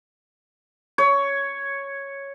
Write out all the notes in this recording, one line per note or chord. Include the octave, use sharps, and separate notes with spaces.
C#5